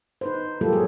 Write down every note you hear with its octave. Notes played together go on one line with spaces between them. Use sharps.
D#4 B4 C5
F#3 G3 A#3 F4 G4 A4
F#3 G#3 G#4